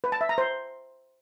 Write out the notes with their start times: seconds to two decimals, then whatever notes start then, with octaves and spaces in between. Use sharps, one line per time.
0.04 B4
0.12 A5
0.21 E5
0.29 A#5
0.38 C5